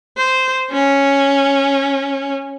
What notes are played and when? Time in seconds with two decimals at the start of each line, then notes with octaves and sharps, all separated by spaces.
0.17 C5
0.71 C#4